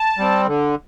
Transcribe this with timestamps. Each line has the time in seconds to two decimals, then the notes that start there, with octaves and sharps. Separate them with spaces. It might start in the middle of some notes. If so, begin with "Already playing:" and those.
Already playing: A5
0.18 G3 C4
0.47 D3